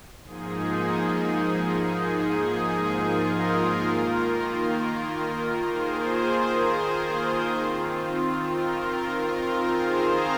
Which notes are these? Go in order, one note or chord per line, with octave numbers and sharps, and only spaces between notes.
G#2 F3 A#3 D#4 G#4
G#4
G#4
F4 A#4
D#3 A#3 F4
G#4 C5
D#3 C4 F4
F4 A#4
F4 A#4
G#4 C5
F5 A#5